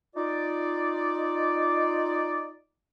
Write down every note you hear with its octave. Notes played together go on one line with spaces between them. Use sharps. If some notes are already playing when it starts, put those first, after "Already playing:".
D#4 F4 D5